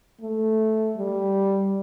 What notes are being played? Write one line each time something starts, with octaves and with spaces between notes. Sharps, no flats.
A3
G3